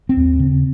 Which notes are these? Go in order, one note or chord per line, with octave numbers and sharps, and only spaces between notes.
C4
D#2
C#3